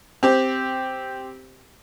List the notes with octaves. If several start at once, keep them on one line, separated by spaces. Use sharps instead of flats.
C4 G4